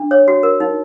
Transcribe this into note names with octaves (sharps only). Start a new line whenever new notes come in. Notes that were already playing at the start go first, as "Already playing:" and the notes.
Already playing: D4
C#5
F#4
A#4
D#4